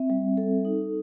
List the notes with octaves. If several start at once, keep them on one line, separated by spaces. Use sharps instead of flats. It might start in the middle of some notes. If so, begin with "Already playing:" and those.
Already playing: C4 E5
G3
A4
D#4